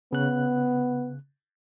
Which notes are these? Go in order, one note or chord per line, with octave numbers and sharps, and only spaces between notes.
C#3 B3 F#6